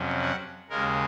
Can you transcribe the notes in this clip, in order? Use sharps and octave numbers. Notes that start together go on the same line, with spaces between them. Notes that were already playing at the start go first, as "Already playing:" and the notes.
Already playing: F2 C3 F#3 C#4
F#5
D#2 C#3 G#3 A#4